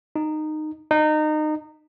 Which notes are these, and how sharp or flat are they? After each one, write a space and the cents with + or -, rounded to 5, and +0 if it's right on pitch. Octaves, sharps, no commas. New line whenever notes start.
D#4 -15
D#4 -25